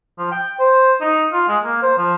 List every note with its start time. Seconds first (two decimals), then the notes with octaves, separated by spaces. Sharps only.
0.18 F3
0.32 G5
0.59 C5
1.01 D#4
1.33 F4
1.48 G#3
1.63 A#3
1.82 C5
1.98 F3